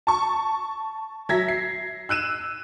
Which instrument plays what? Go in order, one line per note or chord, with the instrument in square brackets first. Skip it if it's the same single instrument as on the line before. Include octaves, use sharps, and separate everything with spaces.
[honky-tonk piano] A5 C#6
F#3 E5 G#6 A#6 B6
C7
E6 F#6 D#7 E7